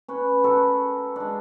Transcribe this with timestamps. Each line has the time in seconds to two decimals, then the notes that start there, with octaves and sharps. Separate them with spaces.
0.08 C#4 B4 C#5
0.44 F#4 A4 A#4 B5
1.16 G#3 D4